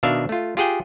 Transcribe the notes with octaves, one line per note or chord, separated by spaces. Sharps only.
B2 D#3 D4 E5 F5
A3 F4
F4 G4 G#4 F#5 G5